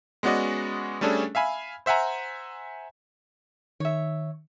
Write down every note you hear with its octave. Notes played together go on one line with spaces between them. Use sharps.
G#3 B3 C#4 F#4 D5 D#5
G3 A3 C#4 D4 G#4 A4
E5 F5 G#5 B5
C5 E5 F#5 G#5 A#5
D#3 C#5 E5